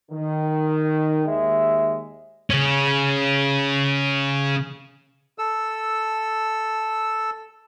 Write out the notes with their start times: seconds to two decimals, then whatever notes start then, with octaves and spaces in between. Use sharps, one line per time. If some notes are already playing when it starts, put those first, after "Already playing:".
0.11 D#3
1.26 D#2 G#3 E5
2.50 C#3 C#4
5.38 A4 E6